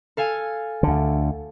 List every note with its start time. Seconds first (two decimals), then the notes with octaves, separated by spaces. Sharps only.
0.17 A4 F5 G#5
0.83 D2 D3